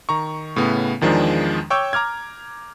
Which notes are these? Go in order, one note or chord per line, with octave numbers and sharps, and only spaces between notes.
D#3 A#5 C#6
A2 C#3 B3
E2 D#3 F3 G#3 D4
C#5 G5 C#6 D6 E6 G6
A#5 D6 F6 G#6